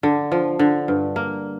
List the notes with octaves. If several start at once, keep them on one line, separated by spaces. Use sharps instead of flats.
D3
F3
D3
G2
A#3